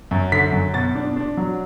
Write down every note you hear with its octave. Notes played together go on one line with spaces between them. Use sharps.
F#2
D3 B6
F#2
B2 A6
D4
D4
F#3